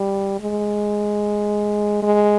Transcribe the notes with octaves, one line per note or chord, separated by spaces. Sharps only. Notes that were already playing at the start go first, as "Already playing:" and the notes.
Already playing: G3
G#3
G#3